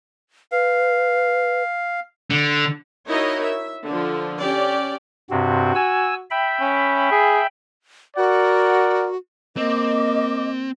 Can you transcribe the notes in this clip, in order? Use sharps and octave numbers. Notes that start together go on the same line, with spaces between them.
B4 F5
D3
D#4 E4 F#4 A#4 C#5 D#5
E5
D3 F3
C#4 G4 D5
G2 C3 C4 F#4
G#5 E6
E5 G5 B5
C#4
G#4
F#4 A#4 D5 F#5
A#3 C4 D#5 D6